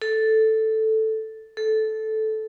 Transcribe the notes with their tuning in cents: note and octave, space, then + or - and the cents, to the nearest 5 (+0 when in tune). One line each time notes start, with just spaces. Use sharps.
A4 +0
A4 -10